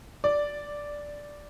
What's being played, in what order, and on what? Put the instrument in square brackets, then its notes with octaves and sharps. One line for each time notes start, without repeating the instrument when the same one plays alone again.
[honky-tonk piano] D5